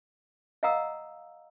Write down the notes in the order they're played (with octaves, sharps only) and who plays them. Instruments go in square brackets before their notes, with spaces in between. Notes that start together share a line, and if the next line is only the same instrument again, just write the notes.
[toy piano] D#5 F5 F#5 A#5 D#6 E6